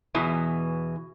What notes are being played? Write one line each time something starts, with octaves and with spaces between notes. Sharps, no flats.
E2 B2 E3